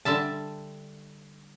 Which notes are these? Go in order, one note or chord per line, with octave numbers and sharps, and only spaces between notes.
D3 G3 E5 A5